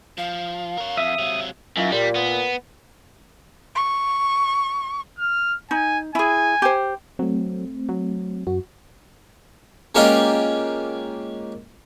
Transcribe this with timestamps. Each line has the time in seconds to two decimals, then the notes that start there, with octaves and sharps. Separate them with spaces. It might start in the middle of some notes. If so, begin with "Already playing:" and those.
0.18 F3 F5
0.78 A#4 C#5
0.97 F2 E5 D#6
1.19 C3 F#3
1.77 F#2 D#3 E4 F4
1.92 A#2 G3
2.16 B3
3.75 C#6
5.18 F6
5.71 D#4 G#5
6.15 E4 G#4 G#5
6.62 G4 C5
7.19 F#3 A3 C4
7.89 F#3
8.47 F#2 F#4
9.95 G#3 A#3 C#4 F4 G4 D#5